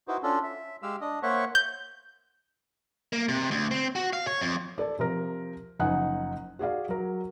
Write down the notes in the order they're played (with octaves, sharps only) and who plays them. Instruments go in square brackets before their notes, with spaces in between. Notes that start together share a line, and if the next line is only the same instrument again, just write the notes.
[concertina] D#4 E4 F#4 B4 C5
C#4 D4 F4 A4
E5
G#3 G4 F5 E6
D4 D#5
A#3 C5 C#5 E5 F#5 C#6
[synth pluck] G6
[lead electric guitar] A#3
C3
D2
C4
F#4
F5
C#5
F2
[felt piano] A4 D5
C3 F3 A#4
F#1 F3 D#4 F#5 G#5 F#6
F#4 G#4 D5 F5
F#3 A#4